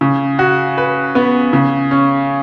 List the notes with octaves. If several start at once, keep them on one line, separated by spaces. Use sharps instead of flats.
C#3
F#4
B4
B3
C#3
C#4